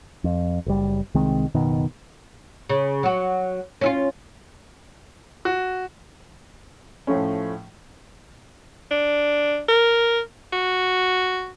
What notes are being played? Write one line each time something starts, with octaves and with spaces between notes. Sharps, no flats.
F2
F#1 G3
C2 D#3 G#3 C4
F#1 B2 D#3
C#3
F#3 F#4
C#4 E4 F4
F#4
A2 F3 A3 C#4
D4
A#4
F#4